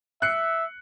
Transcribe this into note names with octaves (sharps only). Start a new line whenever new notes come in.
E5 F#6 C7 C#7